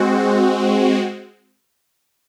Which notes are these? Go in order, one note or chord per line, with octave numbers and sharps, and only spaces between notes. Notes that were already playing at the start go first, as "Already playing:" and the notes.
Already playing: G#3 C4 F#4